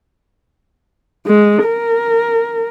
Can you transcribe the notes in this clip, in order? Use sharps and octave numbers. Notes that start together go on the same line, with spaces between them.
G#3
A#4